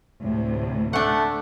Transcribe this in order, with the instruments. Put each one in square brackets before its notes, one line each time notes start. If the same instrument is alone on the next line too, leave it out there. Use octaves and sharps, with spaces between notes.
[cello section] D2 A2 C3
[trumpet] A3 [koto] D4 F#5